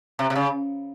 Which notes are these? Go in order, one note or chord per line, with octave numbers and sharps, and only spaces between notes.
C3
C3
C#3